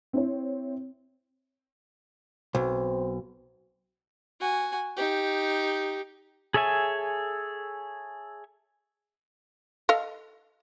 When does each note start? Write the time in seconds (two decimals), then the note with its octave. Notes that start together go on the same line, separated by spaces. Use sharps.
0.13 C4 E4 C#5
2.55 B1 C4
4.41 F#4 G#5
4.97 D#4 G4
6.54 G#4 A4 C#5 E5 G#5
9.89 A4 D#5 F5